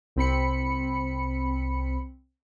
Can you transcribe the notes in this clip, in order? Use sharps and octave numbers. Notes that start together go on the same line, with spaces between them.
C2 C4 B5 C#7